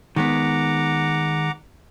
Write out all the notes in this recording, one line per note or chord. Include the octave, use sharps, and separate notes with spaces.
D#3 G#3 B3 F#5 A#5 D6